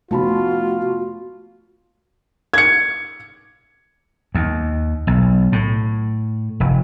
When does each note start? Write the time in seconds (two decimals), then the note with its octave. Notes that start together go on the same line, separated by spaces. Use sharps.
0.11 F1 A3 B3 F4 F#4 A5 B5
2.54 G#6 C#7
4.35 D#2
5.07 B1
5.52 A2
6.60 F1